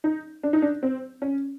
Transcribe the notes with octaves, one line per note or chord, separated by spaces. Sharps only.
D#4
D4
D#4
D4
C4
C#4